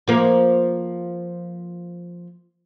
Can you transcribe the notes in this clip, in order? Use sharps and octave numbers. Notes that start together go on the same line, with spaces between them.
F3 A#3